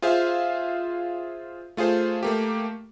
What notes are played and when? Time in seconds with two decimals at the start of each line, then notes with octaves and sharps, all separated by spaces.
0.02 F4 G#4 C5 E5 F5
1.77 A3 F4 G#4 C5
2.23 A3 A#3 G4